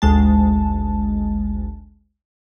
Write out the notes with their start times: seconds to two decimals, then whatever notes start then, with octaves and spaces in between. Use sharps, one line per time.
0.02 G#1 D2 G#3 A5